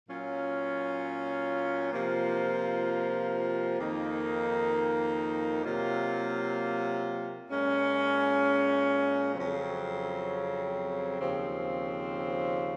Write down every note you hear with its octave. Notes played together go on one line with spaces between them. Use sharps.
A#2 F#3 C#4 F4
C3 F3 A#3 F4
F2 D#3 A#3 D#4
C3 F#3 A#3 F4
A#2 G#3 C#4
F2 C#3 F#3 C4
D#2 C#3 F3 C4